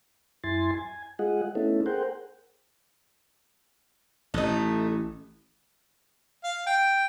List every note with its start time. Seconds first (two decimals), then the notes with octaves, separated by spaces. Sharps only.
0.44 F#2 E4 G#5 C6 A6
0.75 G#5
1.19 G#3 F4 G#4 D#5 F#5
1.55 A3 B3 C#4 D#4 E4 A4
1.86 G#4 A#4 C5 F#5 G5
4.34 A1 A3 D#4
6.44 F5
6.67 G5